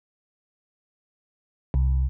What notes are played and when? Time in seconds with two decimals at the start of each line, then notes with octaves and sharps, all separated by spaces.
1.74 C2